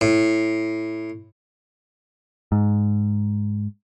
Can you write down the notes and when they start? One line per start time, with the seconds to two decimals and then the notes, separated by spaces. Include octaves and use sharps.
0.01 A2
2.52 G#2